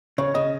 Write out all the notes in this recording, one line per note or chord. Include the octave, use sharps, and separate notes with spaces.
C#3 C#5
C#3 D#5